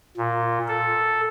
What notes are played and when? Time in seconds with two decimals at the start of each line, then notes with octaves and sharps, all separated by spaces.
0.17 A#2
0.68 A4